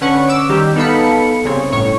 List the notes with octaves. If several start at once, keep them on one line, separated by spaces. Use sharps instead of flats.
D3 C#4 B4 F#5 C#6
D6 E6
D#3 G3 G4
B3 D#4 A4 F5 B5 C#7
C2 C#3 C4 C#5
G1 A2 C#5 C#6